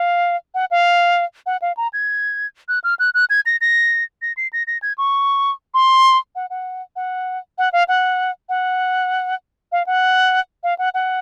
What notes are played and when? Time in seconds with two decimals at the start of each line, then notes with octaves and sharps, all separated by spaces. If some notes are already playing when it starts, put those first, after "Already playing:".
Already playing: F5
0.54 F#5
0.71 F5
1.46 F#5
1.62 F5
1.77 A#5
1.93 G#6
2.68 F#6
2.84 F6
2.99 F#6
3.14 F#6
3.30 G#6
3.46 A#6
3.61 A#6
4.22 A#6
4.37 C7
4.53 A#6
4.67 A#6
4.82 G#6
4.98 C#6
5.74 C6
6.35 F#5
6.50 F#5
6.96 F#5
7.58 F#5
7.73 F5
7.88 F#5
8.49 F#5
9.72 F5
9.86 F#5
10.63 F5
10.78 F#5
10.94 F#5